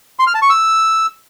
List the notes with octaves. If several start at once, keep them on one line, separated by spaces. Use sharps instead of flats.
C6
F6
A5
C#6
E6